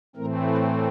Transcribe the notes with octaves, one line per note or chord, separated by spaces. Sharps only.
A2 E3 A3 C4 A#4
B4